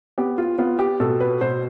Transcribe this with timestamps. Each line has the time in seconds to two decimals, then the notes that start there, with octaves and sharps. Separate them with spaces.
0.18 B3 G4
0.38 F4
0.58 B3 F4
0.79 G4
1.00 B2 A4
1.20 B4
1.41 B2 C5